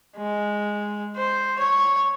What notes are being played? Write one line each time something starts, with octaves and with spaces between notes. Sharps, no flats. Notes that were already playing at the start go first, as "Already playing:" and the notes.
G#3
C5
C#5